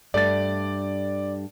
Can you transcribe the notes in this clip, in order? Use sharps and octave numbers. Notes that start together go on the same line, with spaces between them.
G2 A3 D5 A6